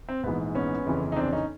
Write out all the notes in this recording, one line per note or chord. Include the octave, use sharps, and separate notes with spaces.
C4
A#1 G#2 E3 B3
B3 C#4
G1 F2 C#3 E3
D#4
C4 D4
C#4 D#4